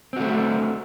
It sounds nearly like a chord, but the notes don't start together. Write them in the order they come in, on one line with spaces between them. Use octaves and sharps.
C4 F#4 A3